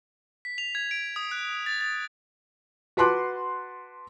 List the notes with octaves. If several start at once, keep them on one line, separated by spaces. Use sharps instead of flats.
B6
F7
G#6
D7
D#6
F#6
A6
A6
F#4 B4 A5 C6 D6 F#6